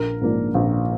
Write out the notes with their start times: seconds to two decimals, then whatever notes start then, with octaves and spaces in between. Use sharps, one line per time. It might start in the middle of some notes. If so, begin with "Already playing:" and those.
Already playing: A#1 A#4
0.21 G#2 F3 A#3 D4
0.54 A#1